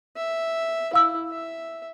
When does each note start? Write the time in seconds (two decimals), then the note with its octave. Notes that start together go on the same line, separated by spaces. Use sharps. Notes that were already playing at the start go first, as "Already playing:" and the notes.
0.17 E5
0.93 E4 F5 E6
1.30 E5